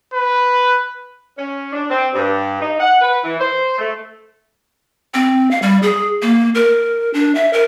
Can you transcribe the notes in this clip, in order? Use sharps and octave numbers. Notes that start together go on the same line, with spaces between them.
B4
C#4
D4
C4
G2
D#4
F#5
B4
E3
C5
A3
C4
F5
G3
G#4
A#3
A#4
D4
E5
A#4